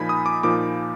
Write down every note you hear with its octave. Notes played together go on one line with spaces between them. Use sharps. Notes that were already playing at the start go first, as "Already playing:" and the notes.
Already playing: A#2 F3 A#3 D#4 G#5 B5
D#6
D6
A#2 F3 A#3 D#4 D6